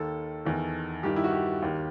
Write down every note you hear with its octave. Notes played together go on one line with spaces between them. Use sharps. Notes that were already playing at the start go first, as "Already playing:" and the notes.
Already playing: D#2 D#3 A4
E2 D#3
G2 D#3 G4
E4
F#4
G4
D#2 D#3